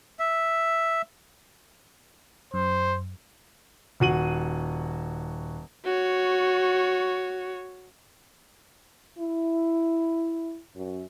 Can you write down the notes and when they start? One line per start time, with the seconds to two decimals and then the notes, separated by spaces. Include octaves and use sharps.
0.19 E5
2.54 F#2 C5
4.00 D#1 F#4 D#7 F#7
5.85 F#4 C#5
9.19 E4
10.75 F#2